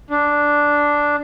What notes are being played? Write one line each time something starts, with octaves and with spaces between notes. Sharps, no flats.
D4